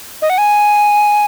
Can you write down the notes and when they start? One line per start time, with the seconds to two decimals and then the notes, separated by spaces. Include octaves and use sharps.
0.22 D#5
0.30 F#5
0.38 G#5